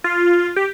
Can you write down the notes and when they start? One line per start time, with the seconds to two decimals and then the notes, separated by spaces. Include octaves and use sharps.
0.04 F4
0.56 G4